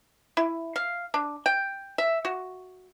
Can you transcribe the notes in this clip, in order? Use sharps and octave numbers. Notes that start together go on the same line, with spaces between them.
E4
F5
D4
G5
E5
F#4